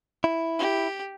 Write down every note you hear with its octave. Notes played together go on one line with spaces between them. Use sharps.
E4
G4